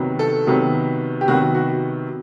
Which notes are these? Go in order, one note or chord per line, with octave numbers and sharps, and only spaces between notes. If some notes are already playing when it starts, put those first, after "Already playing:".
Already playing: C3 D#3 F#3 B3
A4
C3 D#3 F#3 B3
G4
C3 D#3 F#3 B3 F#4
F#4